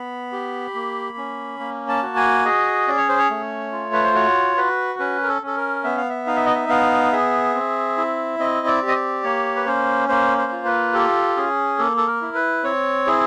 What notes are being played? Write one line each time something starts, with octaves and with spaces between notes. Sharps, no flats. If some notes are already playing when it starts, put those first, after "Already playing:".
Already playing: B3 B5
G4
A#3
C#4
A#3
A5
F#4
G#5
G#4 D#5
C#4 D5
C#5
C5
C#5
A3
F4
B4
C5
F#4 C#5
F#4 B4
C#4 B4
A#4
A4
C#4 A4
A#4
B3 E5
F5
E5
D#4 F5
E5
D#5
E5
B3 F5
G#4 E5
C4
E4
C4 D#5
D5
G4
D#5
D5
A#3 C#5
B4
C#4 C5
A#3 C5
C5
F4
B4
G4 A4
C#4 G#4
A#3 A4
A4
A#4
E4
B4
C4 C#5
E4 G#4